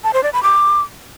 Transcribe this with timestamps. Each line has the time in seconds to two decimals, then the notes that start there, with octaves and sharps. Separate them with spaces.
0.04 A5
0.14 C5
0.23 D5
0.33 B5
0.43 D6